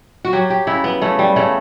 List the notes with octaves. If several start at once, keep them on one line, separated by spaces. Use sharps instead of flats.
F#4
F#3 G4
G4
C#3 E4
B3
C#3 A3
G3
C#3 A3